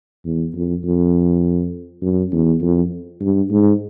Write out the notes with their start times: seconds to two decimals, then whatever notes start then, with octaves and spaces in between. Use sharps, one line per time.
0.25 E2
0.54 F2
0.84 F2
2.02 F#2
2.32 E2
2.62 F2
3.21 G2
3.51 G#2